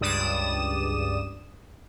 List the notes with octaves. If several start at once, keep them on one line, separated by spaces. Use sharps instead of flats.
C#2 G2 D5 D#6 E7